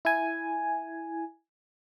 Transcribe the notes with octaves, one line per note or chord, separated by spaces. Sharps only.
E4 G#5